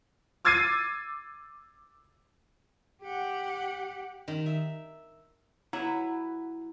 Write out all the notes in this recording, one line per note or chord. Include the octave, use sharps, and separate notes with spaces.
D6 E6 G#6 A6 C7 D#7
G4 F#5
D#3
E5
F#3 E4 B4